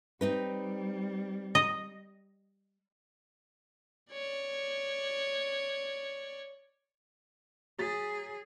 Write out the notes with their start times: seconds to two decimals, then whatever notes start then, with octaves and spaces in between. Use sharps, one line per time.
0.21 G3 C4 D#4 B4
1.55 D#5
4.12 C#5 D5
7.79 F#3 G#4 A6 B6